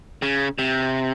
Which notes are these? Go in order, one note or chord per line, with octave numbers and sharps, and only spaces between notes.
C#3
C3